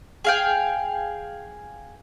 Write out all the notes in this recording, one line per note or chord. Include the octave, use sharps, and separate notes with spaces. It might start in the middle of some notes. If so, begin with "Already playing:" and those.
G#4 F5 G5